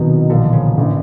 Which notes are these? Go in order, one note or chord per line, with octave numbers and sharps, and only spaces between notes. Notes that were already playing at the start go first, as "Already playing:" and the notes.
Already playing: C2 B2 D#3 F#3 B3 D#4
B1 A#2 D3 F3 A#3
C#3
A1 D3